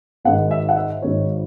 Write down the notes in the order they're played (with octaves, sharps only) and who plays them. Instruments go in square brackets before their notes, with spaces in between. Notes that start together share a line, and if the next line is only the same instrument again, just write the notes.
[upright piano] G#1 G#2 D#3 F#5
E5
F#5
E5
G#1 G#2 D#3 C#5